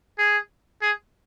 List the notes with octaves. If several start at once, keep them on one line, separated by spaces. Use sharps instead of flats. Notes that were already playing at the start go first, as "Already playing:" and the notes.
G#4
G#4